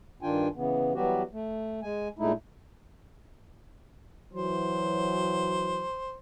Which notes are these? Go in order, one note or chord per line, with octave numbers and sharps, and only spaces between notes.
G2 D#3 D4 F4 G5 G#5
C#3 E3 B3
E3 F#3 G3 B3 F#4 G4
A3
G#3 G#5
A#2 G#3 A3 D#4 E4
E3 F#3 C5